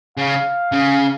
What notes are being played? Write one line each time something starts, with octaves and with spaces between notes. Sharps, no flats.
C#3 F5
C#3